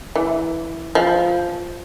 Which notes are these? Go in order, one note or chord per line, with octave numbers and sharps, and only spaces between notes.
E3
F3